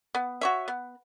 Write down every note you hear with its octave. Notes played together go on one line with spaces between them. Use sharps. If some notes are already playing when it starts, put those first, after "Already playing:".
B3
F#4 C#5 E5
B3